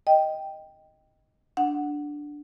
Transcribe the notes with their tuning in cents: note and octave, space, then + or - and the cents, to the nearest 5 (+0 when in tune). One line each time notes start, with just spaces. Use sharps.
D#5 +5 G5 +0
D4 +0 F#5 +0